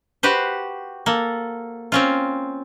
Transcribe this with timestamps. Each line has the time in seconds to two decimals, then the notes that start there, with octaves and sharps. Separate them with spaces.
0.23 F#4 G4 B4 C5
1.06 A#3 A4
1.92 C4 C#4 F4